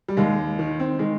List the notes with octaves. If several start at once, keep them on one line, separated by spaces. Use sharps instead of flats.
G3
D#2 G#3
D#3
C4
D#3 G#3